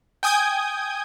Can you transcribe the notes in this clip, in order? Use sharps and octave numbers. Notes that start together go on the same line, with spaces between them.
G5 G#5 D#6 G6 G#6